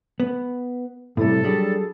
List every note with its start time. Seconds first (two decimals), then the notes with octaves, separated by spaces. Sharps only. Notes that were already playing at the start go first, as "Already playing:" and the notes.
0.20 B3
1.17 A2 C3 G3 E4 A4
1.43 F#3 G3 D4 G#4